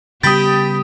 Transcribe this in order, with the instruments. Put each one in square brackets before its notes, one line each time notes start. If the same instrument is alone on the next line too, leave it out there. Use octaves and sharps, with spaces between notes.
[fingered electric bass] C#3 G3 B3 [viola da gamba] G4 [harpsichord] G5 B5 [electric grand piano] D#6 A6